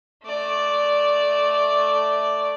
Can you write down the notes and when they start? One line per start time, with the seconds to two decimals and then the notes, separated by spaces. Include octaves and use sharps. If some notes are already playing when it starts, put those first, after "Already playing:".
0.25 A3 D5